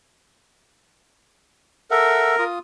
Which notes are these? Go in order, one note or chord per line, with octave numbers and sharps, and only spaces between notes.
A4 A#4 E5 F#5
F4 D#6